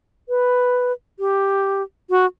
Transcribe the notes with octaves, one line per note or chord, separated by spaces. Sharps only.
B4
G4
F#4